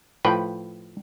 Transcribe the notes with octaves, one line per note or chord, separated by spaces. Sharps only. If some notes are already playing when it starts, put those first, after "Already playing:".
A2 F3 B4 G5